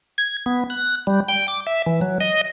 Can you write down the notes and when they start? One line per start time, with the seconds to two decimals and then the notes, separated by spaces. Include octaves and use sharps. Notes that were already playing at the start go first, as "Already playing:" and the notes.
0.18 G#6
0.46 B3
0.70 F#6
1.07 G3
1.29 G5
1.48 D6
1.67 E5
1.86 E3
2.01 F#3
2.20 D#5